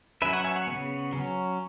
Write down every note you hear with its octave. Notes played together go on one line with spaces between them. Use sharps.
F#3 C#4 B4 E5
C#5 F#5
E5 G#5
C#5 F#5
C#3 G#3 B3
F#3 C#4